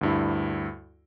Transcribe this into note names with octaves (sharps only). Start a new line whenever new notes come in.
D2 G2 E4